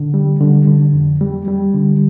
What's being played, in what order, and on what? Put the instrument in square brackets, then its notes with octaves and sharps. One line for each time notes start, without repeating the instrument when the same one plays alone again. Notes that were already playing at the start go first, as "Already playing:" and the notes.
Already playing: [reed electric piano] D3
G3
D3
D3
F2
G3
G3
D3